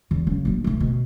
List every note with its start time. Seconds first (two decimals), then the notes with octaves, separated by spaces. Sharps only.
0.11 E2
0.26 C#3 F#3
0.45 A#1 F#3
0.64 B1 A3
0.80 B2